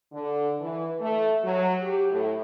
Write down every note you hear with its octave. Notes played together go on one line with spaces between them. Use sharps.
D3
E3
A3
F#3
G4
A2